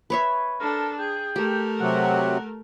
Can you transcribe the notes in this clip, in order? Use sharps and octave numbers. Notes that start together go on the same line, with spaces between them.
B4 C#5 E5
D4 A4 A#4
G#4 G5
A3 G4 A#4
C3 F#3 F#5